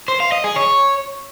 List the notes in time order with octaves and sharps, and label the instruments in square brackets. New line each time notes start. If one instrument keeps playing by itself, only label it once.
[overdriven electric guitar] C5
F5
D#5
G#4
C#5